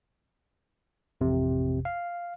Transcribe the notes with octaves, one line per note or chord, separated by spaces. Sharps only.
A1 F2 C3
F5